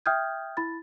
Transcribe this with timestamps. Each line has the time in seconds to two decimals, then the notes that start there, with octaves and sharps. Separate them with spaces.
0.06 E5 G5 D#6 F6 G6 G#6
0.57 E4 B5 A6